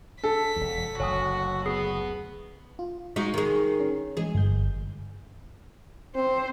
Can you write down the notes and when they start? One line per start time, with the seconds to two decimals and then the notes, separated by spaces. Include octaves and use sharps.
0.23 A4 B6
0.56 E1 E2
1.00 F#1 D2 F#4 C#5 G#5 D#6
1.66 B3 G#4 D#6 C7
2.79 F4
3.16 G#3 D#4 F#4 C#6 C7
3.34 D#3 G#4
3.80 C#4
4.17 E3 G#3 G#4
4.35 G1 G6
6.15 C4 C5